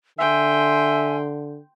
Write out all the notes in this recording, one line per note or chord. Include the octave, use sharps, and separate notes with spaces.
D3 E5 G5 G#5 C6